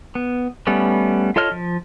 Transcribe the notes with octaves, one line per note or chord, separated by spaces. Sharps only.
B3
G3 A3 B3 C#4
F4 A4 C#5 D#5 F6
F3